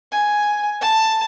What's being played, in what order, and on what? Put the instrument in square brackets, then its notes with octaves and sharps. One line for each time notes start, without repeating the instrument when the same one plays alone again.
[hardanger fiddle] G#5
A5